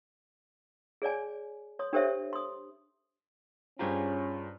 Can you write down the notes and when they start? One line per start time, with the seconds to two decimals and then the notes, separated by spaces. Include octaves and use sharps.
1.02 G#4 C#5 D5 G#5
1.79 C#5 C6 D#6
1.93 D4 G4 A4 C5 C#5 E5
2.33 C6 D#6
3.79 G2 C#4 F4 G4 G#4 C5 A#5